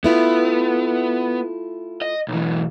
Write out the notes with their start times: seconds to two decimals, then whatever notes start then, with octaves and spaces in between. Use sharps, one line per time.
0.04 A3 B3 E4 F4
2.02 D#5
2.28 B1 E3